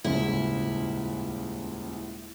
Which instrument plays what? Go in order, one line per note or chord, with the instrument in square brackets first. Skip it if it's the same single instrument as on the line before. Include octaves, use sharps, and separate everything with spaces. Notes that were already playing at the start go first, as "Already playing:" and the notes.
[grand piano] D#1 C#2 G#2 [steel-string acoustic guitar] E4